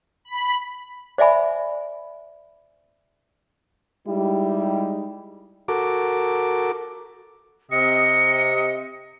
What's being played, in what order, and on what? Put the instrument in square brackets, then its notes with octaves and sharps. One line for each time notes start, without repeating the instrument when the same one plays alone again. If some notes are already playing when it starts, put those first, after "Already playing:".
[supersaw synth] B5
[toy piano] C5 D5 E5 G#5 B5
[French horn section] G3 G#3 D#4 E4 G4
[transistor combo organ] F#4 A4 A#4 D6
[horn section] C3 D#5 [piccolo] C#7